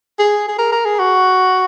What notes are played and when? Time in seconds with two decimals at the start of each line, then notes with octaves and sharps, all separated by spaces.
0.19 G#4
0.48 G#4
0.59 A#4
0.72 A#4
0.85 G#4
0.99 F#4